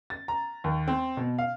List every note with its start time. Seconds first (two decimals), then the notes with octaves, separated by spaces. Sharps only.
0.10 A6
0.28 A#5
0.64 D#2
0.88 C4
1.17 B2
1.38 F5